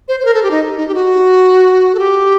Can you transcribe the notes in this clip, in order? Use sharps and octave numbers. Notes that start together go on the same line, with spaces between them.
C5
C5
A#4
A4
G4
D#4
D#4
G4
F#4
A4
G4